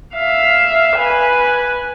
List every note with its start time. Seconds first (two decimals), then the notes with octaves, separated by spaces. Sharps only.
0.14 E5 F5
0.97 B4 G#5